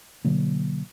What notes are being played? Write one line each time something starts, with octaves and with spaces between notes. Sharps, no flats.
B2 D3 F#3 A#3